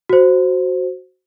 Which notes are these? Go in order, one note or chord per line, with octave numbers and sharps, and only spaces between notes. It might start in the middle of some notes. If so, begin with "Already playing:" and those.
F#4 C5